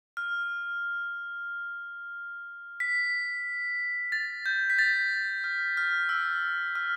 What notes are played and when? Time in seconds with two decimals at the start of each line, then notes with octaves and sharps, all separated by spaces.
0.17 F6
2.80 B6
4.12 A6
4.46 G6
4.70 B6
4.79 A6
5.44 F6
5.77 F6
6.09 E6
6.75 F6